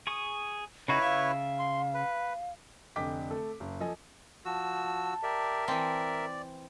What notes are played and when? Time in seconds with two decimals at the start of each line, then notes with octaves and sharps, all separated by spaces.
0.07 G#4 C#6 D#6
0.88 C#3 D#4 E4 F#4 B4 C#5
1.01 C#3 E5 F5
1.59 C6
1.94 B4
2.96 F1 D3 D#5 G5 D6 B6
3.31 A3 A4
3.60 F#1
3.80 F3 A4 D#5 G#5
4.45 F3 F#4 A5 E6
5.23 G4 A#4 D5 E5
5.68 E3 C4 D5